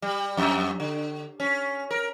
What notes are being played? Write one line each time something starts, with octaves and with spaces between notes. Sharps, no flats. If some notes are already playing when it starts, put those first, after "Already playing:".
G3
F2
D3
C#4
A#4